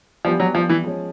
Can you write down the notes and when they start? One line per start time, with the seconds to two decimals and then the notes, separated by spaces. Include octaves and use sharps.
0.25 E3 F3 G3 B3 D4 G4
0.40 F#3
0.55 F3
0.69 E3
0.84 F3 G#3 C#4